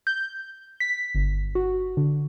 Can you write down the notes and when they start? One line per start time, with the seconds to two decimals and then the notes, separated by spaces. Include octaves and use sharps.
0.07 G6
0.80 B6
1.15 G1
1.55 F#4
1.97 D3